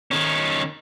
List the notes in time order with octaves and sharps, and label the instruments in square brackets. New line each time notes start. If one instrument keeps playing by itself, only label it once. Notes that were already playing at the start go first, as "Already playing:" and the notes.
[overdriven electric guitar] D#3 C#4